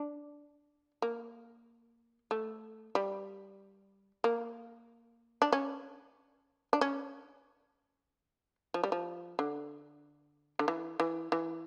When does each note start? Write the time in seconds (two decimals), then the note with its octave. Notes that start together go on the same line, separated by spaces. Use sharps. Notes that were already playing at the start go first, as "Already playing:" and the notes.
Already playing: D4
1.02 A#3
2.31 A3
2.95 G3
4.24 A#3
5.42 D4
5.53 C#4
6.73 D4
6.81 C#4
8.74 F3
8.83 G3
8.92 F3
9.39 D3
10.59 D3
10.68 E3
11.00 E3
11.32 E3